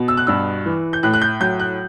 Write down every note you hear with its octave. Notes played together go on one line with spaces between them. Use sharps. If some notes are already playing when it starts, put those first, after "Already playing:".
Already playing: B2
E6
F#6
G2 E6
E3
G6
A2 F#6
F#6
G6
F#3 G6
F#6